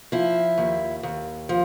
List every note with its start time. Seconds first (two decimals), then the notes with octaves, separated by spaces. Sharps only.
0.12 F3 E4
0.58 D#2
1.03 D#2
1.49 F3